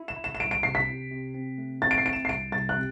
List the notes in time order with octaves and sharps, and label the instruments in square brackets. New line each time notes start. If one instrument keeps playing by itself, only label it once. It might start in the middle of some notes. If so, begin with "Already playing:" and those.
Already playing: [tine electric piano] E4
[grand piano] E7
[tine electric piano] E4
[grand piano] E7
E7
[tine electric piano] C2 [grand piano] D7
[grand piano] D7
[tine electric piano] C3 [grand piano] C7
[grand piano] B6
[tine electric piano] C3
C3
C4
A3
[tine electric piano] C4 [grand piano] A6
[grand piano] D7
C7
[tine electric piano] E4 [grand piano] D7
[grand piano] E7
C7
[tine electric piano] C2 [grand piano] D7
[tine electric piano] C2 [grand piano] A6
[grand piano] F#6
[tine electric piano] C3